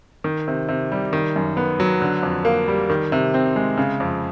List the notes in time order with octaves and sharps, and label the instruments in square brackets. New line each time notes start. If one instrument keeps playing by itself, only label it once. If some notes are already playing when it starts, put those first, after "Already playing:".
[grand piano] D#3
C3
C3
G3
D#3
F#2
B3
F#3
D3
F2
A#3
G3
D#3
C3
C4
G#3
C#3
F2